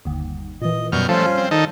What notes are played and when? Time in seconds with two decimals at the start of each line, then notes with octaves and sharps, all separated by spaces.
0.05 G1 D#2
0.62 A#2 E3 D#5
0.92 F#2 B2 G3 C#6 F6 G6
1.09 F3 A3 C#4 F4 C5
1.37 C4
1.51 D#3 D#4 A4